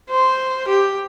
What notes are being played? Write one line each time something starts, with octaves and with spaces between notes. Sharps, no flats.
C5
G4